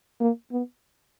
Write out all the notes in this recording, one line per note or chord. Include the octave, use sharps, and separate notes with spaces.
A#3
B3